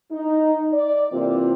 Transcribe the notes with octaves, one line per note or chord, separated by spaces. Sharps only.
D#4
D5
C3 E3 A#3 C4 F4